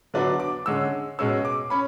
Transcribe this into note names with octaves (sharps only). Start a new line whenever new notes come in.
D3 F#3 B3 D4
D6
D3 G#3 C#4 E6
B2 G#3 C#4 E6
D6
C#4 B5